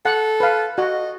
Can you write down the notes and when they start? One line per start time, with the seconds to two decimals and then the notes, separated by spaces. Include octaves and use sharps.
0.05 A4 F#5
0.40 B4 F5
0.78 F#4 D#5